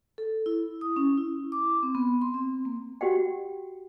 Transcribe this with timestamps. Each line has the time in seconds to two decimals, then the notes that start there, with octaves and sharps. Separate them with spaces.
0.18 A4
0.46 E4
0.81 D#6
0.96 C#4
1.18 E4
1.52 D6
1.83 C4
1.95 B3
2.22 C6
2.34 C4
2.65 A#3
3.01 F#4 G4 F#5 G5